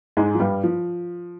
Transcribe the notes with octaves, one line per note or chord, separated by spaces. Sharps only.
G#2 G#3
F3
G2 G3
F3